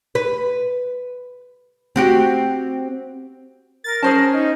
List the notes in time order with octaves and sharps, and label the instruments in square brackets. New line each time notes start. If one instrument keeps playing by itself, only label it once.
[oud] B4
C4 F#4 G4
[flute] A#4 [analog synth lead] A6
[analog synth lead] C#4 [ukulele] G#4 C5 A5
[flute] D#4